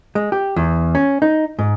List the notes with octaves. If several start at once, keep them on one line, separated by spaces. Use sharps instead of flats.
G#3
G4
E2
C#4
D#4
G#2